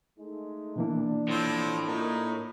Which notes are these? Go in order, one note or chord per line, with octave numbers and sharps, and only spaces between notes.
G#3 A3 D#4
B2 E3 A#3 D4
A2 F3 C4
A#3 D#4 F4 A#4